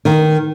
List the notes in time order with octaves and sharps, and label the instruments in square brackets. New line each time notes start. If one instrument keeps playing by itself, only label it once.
[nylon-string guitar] D#3